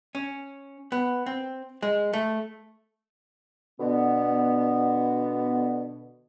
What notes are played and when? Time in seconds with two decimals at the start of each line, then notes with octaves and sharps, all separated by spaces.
0.15 C#4
0.92 B3
1.26 C4
1.83 G#3
2.13 A3
3.80 B2 D3 B3